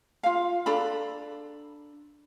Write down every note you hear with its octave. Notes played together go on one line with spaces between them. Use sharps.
F4 F5
D4 A4 A#5 B5